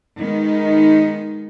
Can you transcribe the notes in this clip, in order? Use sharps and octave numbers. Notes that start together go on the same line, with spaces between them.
D#3 G#3 B3 D#4